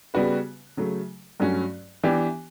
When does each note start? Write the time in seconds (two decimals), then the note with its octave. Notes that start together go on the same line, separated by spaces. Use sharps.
0.14 C#3 G3 B3 F#4 B4
0.77 C#3 F#3 A3
1.40 G2 F#3 A3 C#4 F#4
2.03 E3 B3 D4 G4